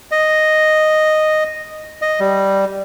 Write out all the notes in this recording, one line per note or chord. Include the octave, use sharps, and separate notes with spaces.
D#5
D#5
G3